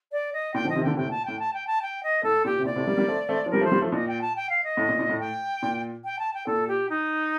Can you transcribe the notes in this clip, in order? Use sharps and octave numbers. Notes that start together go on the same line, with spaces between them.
D5
D#5
A#2 G5
D3 F3
D#5
C3 D#3
A#2 D3 G5
A2 C3 G5
A#2
A5
A2 G5
A5
G5
A5
G5
D#5
A2 A4
A#2 G4
C3
A#2 D5
A2 C3
G3 A#3
G3 A#3
A3 C4
A3 C4
F3
G3 A#4
F3 A3
C5
G3 A#3
F3 A3
A#2 D#5
G5
A5
G5
F5
D#5
A2
A#2
A#2
A2
G5
A#2
G5
A5
G5
A#2 A4
G4
D#4